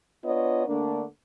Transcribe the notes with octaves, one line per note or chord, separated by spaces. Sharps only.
B3 D4 F4 C#5 D#5
D3 A3 A#3 D4